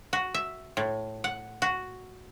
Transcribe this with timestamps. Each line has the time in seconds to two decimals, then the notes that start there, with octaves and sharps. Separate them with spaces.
0.13 F#4
0.34 E5
0.77 A2
1.24 F#5
1.62 F#4